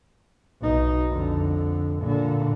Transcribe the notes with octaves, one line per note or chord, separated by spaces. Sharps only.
B1 D#4
F2 D3
A#2 D3